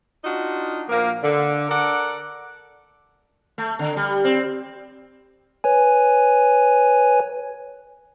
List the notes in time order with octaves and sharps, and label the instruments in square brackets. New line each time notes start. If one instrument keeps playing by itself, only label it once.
[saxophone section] D4 D#4 F4 F#4
A#2 F3 A#3
D3
A4 A#4 D5 F#5
[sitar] A3
D3
G3
C4
[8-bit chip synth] B4 C#5 G#5